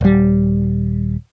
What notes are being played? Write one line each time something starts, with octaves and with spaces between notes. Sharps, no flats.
D#1 G3